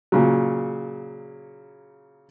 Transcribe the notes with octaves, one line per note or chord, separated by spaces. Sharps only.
A#2 C#3 F#3